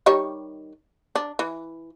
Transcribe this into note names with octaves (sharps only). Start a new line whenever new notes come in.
D#3 G3 C#5
D4
E3